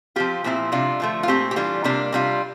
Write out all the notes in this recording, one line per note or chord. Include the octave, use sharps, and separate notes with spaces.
F3 C4 F4 G4
A#2 F3 C4 E4
C3 G3 D4 F4
D3 F3 A3
F4
A#2 A3 C4 G4
G4
E3 G3 D4 F4
C3 G3 A#3 D4
C3 G3 D4 F4